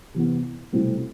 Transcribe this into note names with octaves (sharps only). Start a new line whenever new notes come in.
C3 E3 B3
C2 B2 A3 C4 E4